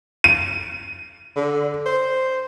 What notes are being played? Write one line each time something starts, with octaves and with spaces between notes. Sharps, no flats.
D#7
D3
C5